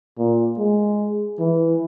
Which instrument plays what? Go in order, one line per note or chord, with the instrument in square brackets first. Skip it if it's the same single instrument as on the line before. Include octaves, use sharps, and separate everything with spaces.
[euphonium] A#2
G#3
E3